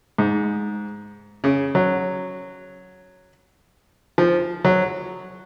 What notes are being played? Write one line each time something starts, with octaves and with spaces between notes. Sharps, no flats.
G#2
C#3
F#3
F3
F#3